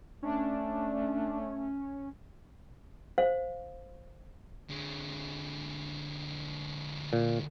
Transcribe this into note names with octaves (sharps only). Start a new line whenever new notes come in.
A3 C#4 D4
C5 F5
D3 G#3
A#2